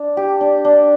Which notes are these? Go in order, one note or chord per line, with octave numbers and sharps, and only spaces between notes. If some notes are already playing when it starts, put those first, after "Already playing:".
Already playing: D4
G4
D4
D4